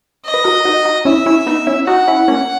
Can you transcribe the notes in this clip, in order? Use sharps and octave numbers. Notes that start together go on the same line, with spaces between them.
D#5
B4
F#4 A#4
D#4 F#4
D#4 F#4
C#4 E4 E5
C#4 E4
B3 D#4
C#4 E4
D#4 F#4 F#5
C#4 E4
A#3 C#4